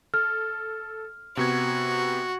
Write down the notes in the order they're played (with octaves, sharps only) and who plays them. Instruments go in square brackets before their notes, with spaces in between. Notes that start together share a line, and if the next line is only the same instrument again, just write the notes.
[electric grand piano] A4 [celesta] F6
[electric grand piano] C3 B3 G#6 [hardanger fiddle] F#4